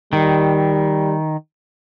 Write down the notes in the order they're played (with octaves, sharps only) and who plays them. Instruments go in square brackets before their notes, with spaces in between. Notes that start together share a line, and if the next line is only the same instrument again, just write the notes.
[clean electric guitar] D#3 [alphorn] G3